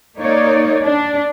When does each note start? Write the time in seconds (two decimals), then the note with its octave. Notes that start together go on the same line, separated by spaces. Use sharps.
0.18 A#3 D#4 C#5 D5
0.83 D4